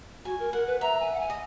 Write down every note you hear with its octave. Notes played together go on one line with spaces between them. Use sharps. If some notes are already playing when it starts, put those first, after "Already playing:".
F#4 G#5
A#4
A#4 F#5
B4
E5 A#5
G#5
F#5
G#5
D#5